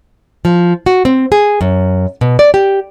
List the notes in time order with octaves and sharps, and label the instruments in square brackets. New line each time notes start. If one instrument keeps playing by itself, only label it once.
[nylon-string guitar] F3
F#4
C4
G#4
F#2
B2
D5
G4